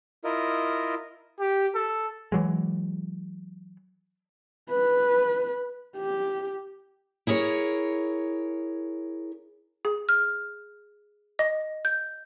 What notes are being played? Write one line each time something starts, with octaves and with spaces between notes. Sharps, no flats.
E4 F4 A#4 D#5
G4
A4
E3 F#3 G#3
B4
G4
E4 G#4 A#4 C#5
G#4
F6
D#5
G6